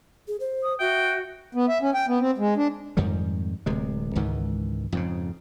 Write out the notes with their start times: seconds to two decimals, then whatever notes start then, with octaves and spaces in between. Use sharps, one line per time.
0.28 G#4
0.40 C5
0.63 D#6
0.80 F#4 E5 G5
1.55 B3
1.68 E5
1.82 C#4
1.94 G5
2.08 B3
2.20 C4
2.38 G#3
2.57 D4
2.97 F2 G#2 D#3 G3
3.66 D1 C3 G#3
4.16 C#2 G#2 D#3 E3
4.92 F2 G#2 C#3